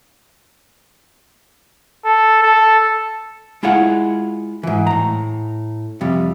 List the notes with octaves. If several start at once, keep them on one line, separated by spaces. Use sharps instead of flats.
A4
A4
G#3 E4 F4 G#4 F#5
G#2 E3
A2 A#5
F2 C3 G3